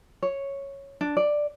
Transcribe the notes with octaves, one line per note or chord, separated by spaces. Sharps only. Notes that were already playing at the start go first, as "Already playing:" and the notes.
C#5
D4
D5